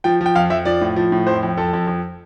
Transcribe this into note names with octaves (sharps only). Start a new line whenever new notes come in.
F3 G5
F3
G5
F2 F5
F2 E5
F3 D5
A2
F3
A2
F2 C5
F2
F2 A4
F2
F2